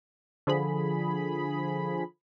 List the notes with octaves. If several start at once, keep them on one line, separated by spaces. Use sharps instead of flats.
D3 F3 G#4 B5